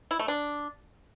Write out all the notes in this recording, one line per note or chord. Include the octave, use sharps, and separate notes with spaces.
E4
A3
D4